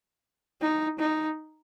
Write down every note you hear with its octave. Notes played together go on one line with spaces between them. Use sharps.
D#4
D#4